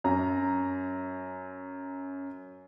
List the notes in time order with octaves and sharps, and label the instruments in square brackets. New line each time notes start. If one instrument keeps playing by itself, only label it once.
[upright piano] F#2 A#5